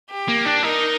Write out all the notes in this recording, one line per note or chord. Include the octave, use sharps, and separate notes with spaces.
G4
A#3
D4
D#4 A#4